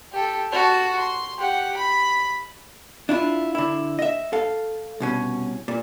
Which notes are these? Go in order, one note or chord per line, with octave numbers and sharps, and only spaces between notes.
G4 A4
F#4 A5
C6
G4 F#5
B5
D4 E4 F4
D3 E4
D#5 E5
A4 F5
C2 B2 C#4
A#2